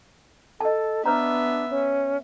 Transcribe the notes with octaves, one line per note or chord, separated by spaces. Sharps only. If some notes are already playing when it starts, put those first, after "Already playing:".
A4 D#5 A5
B3 D4 B4 C#5 E5 A#5
C#4